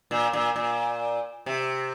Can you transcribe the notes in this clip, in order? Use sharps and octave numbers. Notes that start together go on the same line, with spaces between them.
A#2
A#2
A#2
C3